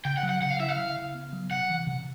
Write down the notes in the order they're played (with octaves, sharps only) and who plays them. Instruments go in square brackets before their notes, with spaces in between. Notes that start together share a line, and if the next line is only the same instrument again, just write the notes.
[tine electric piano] C#3 [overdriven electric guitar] G5
[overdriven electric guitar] F#5
[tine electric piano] F#3
[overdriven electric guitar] F#5
[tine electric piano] C#3 [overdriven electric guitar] F#5
[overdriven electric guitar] F5
[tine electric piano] E4 [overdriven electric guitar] E5
[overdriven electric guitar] F5
[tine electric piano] C#3
C#3
B3
F#3
[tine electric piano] C3 [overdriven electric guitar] F#5
[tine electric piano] E3
C3